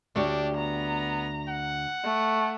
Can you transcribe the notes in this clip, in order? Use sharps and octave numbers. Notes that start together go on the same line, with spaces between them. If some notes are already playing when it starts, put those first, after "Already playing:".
D2 D4 G4 C#5 D5
B3 A#5
F#5
A3